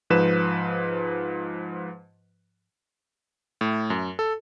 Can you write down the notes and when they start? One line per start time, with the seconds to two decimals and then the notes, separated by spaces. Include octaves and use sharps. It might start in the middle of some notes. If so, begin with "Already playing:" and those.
0.10 G#2 F3 B4 E7
3.61 A2
3.90 F#2
4.19 A4